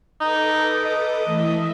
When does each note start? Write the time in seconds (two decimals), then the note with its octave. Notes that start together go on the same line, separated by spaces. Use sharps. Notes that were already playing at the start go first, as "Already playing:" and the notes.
0.21 D#4 A4 B4 D6
0.85 D#5
1.25 E3 A3 E5